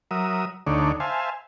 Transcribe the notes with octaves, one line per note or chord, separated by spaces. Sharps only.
F#3 A#4 E5 D#6
D2 D3 A3 D#4 C#5 D5
C5 E5 F5 G#5 A5